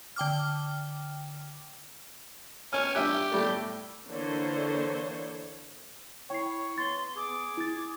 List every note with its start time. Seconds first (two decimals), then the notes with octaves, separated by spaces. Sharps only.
0.16 D3 G5 D6 F6
2.73 C#4 F6
2.95 G2 G4 E5 F#6
3.32 A2 G3 A3
4.08 D3 E3 A#3 C5 C#5
6.30 E4 C#5 G5 C#6 C7
6.78 B3 C6 A6
7.16 G#4 D6
7.57 E4 A6